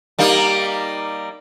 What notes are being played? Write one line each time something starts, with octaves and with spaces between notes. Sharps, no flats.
G3 A#3 D#4